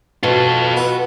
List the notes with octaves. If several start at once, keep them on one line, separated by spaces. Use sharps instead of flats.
B2 F4 A4
B3